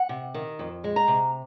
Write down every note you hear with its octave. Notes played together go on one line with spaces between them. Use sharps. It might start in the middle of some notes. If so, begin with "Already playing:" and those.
Already playing: F#5
C3
D#3
F2
G#3
A#5
C3